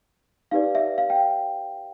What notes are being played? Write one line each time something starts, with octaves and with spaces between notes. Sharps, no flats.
D#4 G4 B4 D5 F5
E5
F5
G5